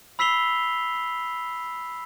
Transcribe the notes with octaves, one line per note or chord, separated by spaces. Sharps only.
B5 E6 B6 C7 F7 G7